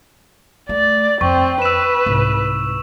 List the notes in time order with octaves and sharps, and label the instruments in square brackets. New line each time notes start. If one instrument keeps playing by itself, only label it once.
[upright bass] A3 [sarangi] D5
[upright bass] F2 [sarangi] C4 [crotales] C#6
[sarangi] B4 [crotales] E6 E7
[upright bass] C2 G#2